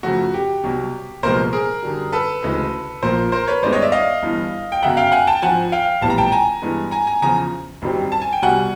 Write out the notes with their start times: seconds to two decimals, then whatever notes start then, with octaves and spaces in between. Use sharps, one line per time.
0.03 F#2 C#3 F3 A3 F#4
0.34 G4
0.63 C2 B2 F#3
1.23 C2 A#2 F3 G#3 B3 A#4 C5
1.53 G#4 A#4
1.82 F#2 D3 G3
2.12 A4 B4
2.42 D2 C#3 E3 G#3
3.02 A#1 A#2 F3 A#3 A#4 C5
3.32 A#4 C5
3.47 B4 C#5
3.62 G2 D#3 G#3 B3 C5 D5
3.73 C#5 D#5
3.82 D5 E5
3.92 D#5 F5
4.22 G1 G2 E3
4.72 G5
4.82 G1 F#2 C#3 E5 F#5
4.97 F5 G5
5.12 F#5 G#5
5.27 G5 A5
5.42 G#1 G#2 F3 F#5 G#5
5.72 F5 G5
6.02 A#1 A2 E3 G3 B3 A5
6.10 A#5
6.18 G5 A5
6.32 G#5 A#5
6.62 G2 E3 G#3 B3
6.91 G#5 A#5
7.07 G#5 A#5
7.22 E2 C#3 F3 G#5 A#5
7.82 F#1 F#2 D#3 G3 C4
8.12 A5
8.22 G#5
8.33 G5
8.42 C2 B2 G3 F#5 G#5